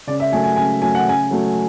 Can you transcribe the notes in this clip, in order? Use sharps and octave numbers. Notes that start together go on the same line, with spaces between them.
C#3 D5
E5
F#3 A3 G#5
G#5
C#3 G#5
F#3 A3 G#5
F#5
C#3 G#5
F#3 A3